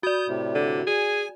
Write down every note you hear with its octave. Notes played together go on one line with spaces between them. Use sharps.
F#4 D5 D#6 G6
A2 C3
D3
G#4 G#5